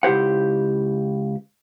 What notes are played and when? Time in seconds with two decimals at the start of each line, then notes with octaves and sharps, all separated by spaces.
0.03 C#2 E4 G4 C5 F#5